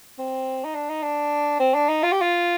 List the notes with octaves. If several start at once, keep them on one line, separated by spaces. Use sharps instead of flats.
C4
D#4
D4
D#4
D4
C4
D4
D#4
F4
G4
F4